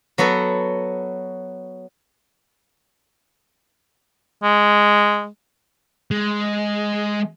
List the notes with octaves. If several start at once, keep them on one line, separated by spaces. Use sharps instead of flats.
F#3 B3 F#4 A4
G#3
G#3